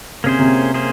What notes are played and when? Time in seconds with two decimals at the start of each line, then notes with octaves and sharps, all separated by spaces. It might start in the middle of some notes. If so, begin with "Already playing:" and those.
0.24 C3 A#3 C#4 G#4 C5
0.39 C3
0.74 A#3 C#4 G#4 C5